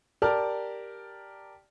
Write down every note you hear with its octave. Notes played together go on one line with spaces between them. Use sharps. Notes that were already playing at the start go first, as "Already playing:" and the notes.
G4 A#4 D5 A5 F6